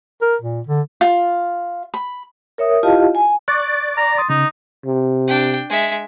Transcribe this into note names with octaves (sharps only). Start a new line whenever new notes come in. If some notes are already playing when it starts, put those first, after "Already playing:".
A#4
A#2
D3
F4
B5
A#4 C#5 E5 D#6
E4 F4 G4 D#5 F5 A5
G#5
D5 C#6 F#6
A#5
C6 D#6 A6
C#3 D#4
C3
D4 G5
G#3 E5